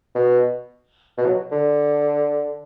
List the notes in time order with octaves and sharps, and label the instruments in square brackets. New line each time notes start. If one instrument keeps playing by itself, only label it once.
[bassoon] B2
B2
F#3
D3